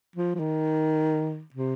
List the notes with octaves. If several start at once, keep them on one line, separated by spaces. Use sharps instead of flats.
F3
F3
D#3
C3